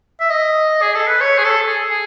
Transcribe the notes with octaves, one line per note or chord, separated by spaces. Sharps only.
E5
D#5
G#4
A4
B4
C#5
G#4
A4
G#4
G#4